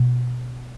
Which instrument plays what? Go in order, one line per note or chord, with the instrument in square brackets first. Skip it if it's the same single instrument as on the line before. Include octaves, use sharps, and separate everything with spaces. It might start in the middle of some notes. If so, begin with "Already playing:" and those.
Already playing: [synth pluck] B2